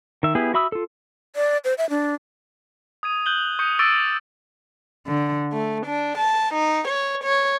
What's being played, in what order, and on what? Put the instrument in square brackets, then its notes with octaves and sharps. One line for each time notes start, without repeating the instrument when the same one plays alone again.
[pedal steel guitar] D#3 E5
B3 E4 G4 G#4
F#4 E5 B5 D#6 E6
F4 A4
[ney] D5
C5
E5
D4
[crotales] D#6 G#6 D#7
F#6 G6 F#7 G7
C#6 D#6 G6 C#7
C#6 D6 E6 A6 D7 G7
[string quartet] D3
A3
D4
A5
D#4
C#5
C#5